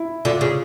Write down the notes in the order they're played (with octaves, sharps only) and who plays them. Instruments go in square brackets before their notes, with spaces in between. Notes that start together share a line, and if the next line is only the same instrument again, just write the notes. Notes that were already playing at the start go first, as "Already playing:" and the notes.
Already playing: [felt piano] E4
[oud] D3 [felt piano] F4
[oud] C#3